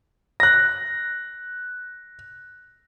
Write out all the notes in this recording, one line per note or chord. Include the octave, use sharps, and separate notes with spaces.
F#6 A#6